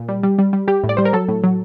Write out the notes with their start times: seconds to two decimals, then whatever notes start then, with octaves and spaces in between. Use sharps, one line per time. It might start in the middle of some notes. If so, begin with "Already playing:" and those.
Already playing: A#2
0.08 G3
0.23 G3
0.38 G3
0.53 G3
0.68 G3 G4
0.84 A2
0.89 D5
0.97 G3 C5
1.05 A#4
1.13 F#3 A4
1.28 A2
1.44 F#3